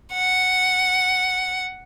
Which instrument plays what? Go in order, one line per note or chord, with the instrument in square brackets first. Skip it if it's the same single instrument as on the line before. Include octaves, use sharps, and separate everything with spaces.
[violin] F#5